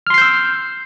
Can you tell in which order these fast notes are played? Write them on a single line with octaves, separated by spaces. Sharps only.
F6 C6 C7 G6 E6